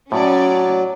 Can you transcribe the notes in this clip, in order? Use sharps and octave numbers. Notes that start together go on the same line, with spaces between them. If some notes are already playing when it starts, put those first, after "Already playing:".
A2 F#3 C#4 D5